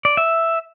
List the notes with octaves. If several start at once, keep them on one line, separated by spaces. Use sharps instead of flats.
D5
E5